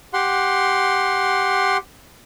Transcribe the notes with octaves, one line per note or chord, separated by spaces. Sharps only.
G4 F#5 C6